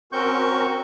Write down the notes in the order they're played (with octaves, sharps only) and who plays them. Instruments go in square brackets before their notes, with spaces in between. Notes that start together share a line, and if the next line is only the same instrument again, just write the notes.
[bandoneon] C4 C#6 G6 [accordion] C#4 F#4 A#4